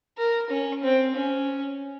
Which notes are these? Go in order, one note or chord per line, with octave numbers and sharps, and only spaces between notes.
A#4
C#4
C4
C#4